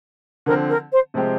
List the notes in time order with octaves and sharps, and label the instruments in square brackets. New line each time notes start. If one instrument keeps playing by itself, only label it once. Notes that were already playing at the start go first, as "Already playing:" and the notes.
[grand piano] D3 F3 C4 [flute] A#4
[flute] A#4
C5
[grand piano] C3 F3 G#3 C4 G4